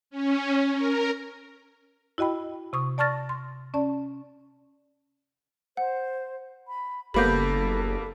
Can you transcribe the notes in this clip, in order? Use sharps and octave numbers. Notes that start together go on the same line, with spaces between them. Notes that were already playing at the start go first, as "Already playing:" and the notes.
C#4
A#4
E4 F#4 D#5 G5 B5
C3 C#6 D#6
D5 A5 C#6 F6 A6 A#6
C6
C#4 D5 A5
C5 F#5
B5
F#1 G3 A#3 B3 A4 B5 G6